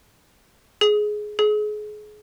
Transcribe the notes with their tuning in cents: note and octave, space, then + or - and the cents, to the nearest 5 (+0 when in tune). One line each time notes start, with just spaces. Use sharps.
G#4 +15
G#4 +30